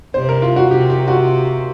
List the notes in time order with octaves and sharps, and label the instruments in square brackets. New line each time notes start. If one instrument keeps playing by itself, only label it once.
[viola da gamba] C3 [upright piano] C5
[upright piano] A#4
F4
F#4
[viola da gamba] C3 [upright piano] G4
[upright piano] G4
F#4